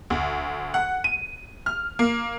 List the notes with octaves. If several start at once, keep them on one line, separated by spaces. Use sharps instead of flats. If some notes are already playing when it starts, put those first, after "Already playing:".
D2
F#5
D#7
F6
A#3